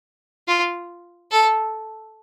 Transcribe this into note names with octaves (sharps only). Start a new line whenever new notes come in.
F4
A4